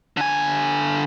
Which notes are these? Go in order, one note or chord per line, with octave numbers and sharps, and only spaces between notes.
D3 G#5